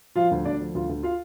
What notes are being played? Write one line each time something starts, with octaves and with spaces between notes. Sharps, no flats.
F3 F4 F5
D2
D2 D4 D5
F3
D2 F4
D2
F4 F5